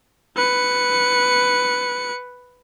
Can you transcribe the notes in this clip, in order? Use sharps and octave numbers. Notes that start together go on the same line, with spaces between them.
B4 C#7